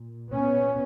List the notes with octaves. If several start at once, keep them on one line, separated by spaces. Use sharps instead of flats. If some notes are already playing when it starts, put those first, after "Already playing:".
Already playing: A#2
B3 C#4